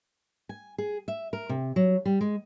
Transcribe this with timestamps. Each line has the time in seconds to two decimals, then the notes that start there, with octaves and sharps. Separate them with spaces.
0.49 G#5
0.78 G#4
1.08 E5
1.33 A#4
1.49 C3
1.76 F#3
2.06 G3
2.21 G#3